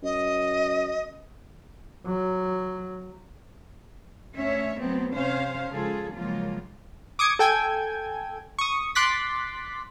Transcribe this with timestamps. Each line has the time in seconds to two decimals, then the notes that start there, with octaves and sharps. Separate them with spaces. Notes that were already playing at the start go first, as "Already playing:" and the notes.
0.03 F#2 D#5
2.06 F#3
4.36 D2 C#4 C#5 E5
4.81 F#3 A3 B3 C4
5.15 C3 C#4 C5 F5
5.70 C#3 F3 G#3 F4 G#4 A4
6.15 C#3 F3 F#3 G#3 A#3 F4
7.19 D6 D#6 G#6 C#7
7.39 A4 G5 G#5 G#6
8.59 C#6 D#6
8.95 C6 D6 F#6 A6 B6